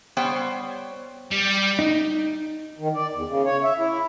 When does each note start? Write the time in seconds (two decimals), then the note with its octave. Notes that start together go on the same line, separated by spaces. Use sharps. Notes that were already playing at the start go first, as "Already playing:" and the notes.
0.17 G3 B3 C5 C#5 G5
1.31 G3
1.79 D#4
2.78 D#3
2.94 D5
3.13 E2
3.27 C#3
3.45 C#5
3.63 E5
3.78 E4